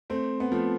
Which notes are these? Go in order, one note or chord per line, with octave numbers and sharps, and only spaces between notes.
A3 C4
B3
F3 A3